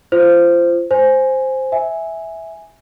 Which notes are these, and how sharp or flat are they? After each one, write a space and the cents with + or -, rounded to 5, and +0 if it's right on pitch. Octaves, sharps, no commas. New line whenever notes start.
F4 -30 C5 -10
C5 +0 G#5 +0
E5 -10 G#5 -5